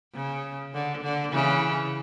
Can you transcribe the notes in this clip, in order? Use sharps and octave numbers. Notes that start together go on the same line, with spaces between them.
C#3
D3
D3
C#3 E3